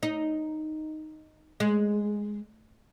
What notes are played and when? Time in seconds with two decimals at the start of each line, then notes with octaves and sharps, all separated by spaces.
0.03 D#4
1.60 G#3